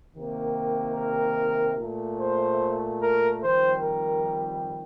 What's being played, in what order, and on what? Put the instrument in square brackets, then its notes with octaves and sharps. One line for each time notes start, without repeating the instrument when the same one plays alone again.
[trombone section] C3 D#3 A#3
A#4
A#2 A3
C5
A#4
F2 D#3 G3 C5
A#4